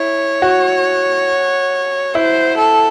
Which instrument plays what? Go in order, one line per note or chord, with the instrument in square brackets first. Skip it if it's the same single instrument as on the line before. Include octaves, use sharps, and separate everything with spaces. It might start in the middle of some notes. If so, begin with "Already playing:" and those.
Already playing: [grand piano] E4 [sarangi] C#5
[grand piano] F#4
[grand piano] E4 [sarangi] C5
[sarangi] A4